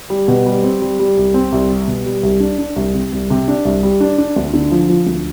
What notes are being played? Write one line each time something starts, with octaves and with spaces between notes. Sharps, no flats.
G3
B2
G3
C4
G3
G3
C2
C4
C2
G3
B2
G3
C2
D4
D4
C2
C3
C2
C3
D4
C2
G3
D4
D4
D2
D3
F3
F3
D2